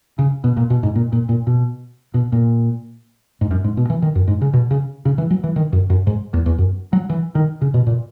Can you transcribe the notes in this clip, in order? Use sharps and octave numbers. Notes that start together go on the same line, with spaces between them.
C#3
B2
A#2
B2
G#2
A#2
A#2
A#2
B2
B2
A#2
G#2
F#2
G#2
B2
E3
D#3
F#2
G#2
C#3
B2
C#3
C#3
E3
F#3
E3
D#3
F#2
F#2
G#2
E2
E2
F#2
F#3
E3
D#3
C#3
B2
A#2